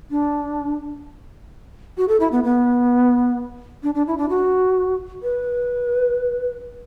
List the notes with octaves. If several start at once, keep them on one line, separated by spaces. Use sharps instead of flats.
D4
F#4
A4
E4
B3
B3
D4
D4
E4
D4
F#4
B4